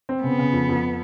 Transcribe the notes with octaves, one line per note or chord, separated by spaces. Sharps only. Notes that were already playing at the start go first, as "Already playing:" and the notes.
C4
C#3 B3
C#3
F2
F2